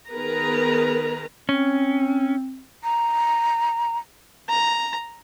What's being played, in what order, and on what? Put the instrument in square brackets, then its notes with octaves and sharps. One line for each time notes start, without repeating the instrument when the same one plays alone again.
[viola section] D#3 B3 G#4 A#4 B4 A#5
[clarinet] C4 [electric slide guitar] C#4
[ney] A#5
[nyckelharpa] A#5